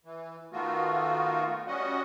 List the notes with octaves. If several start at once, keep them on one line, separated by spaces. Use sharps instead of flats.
E3
D#3 A3 B3 F4 F#4
G3 C#4 F#4 D#5 F#5